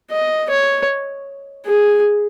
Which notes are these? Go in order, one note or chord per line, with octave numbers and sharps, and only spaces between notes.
D#5
C#5
G#4